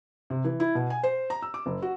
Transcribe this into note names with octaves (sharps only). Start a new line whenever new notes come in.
C3
E3
E4
B2
G#5
C5
A#5
E6
D6
F#1
F#4